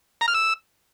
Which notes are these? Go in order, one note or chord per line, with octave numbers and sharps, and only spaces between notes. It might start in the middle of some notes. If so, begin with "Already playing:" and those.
A#5
F6
E6